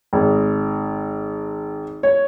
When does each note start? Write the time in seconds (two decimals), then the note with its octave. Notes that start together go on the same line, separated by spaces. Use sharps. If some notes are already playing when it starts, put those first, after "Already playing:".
0.13 G#1
2.03 C#5